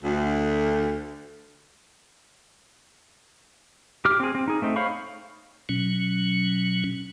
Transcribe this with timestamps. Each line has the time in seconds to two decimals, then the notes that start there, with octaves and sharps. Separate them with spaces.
0.03 D2
4.05 G4 D6 F6
4.20 C4 G#4
4.35 C4
4.48 D#4 G#4
4.62 A3 C4 D#4
4.76 C5 C#5 F5 B5 C#6
5.69 B2 F#3 C#4